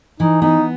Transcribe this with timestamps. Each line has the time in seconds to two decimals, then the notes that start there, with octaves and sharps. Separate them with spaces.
0.20 E3 D#4
0.42 B3 D#4